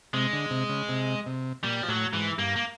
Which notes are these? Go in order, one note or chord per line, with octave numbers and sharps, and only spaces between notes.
C3 G#3
D3
C3
C#3
C3
C3
A#2 G3
F3
A2 F#3
G#2 E3
G2 A#3
A#3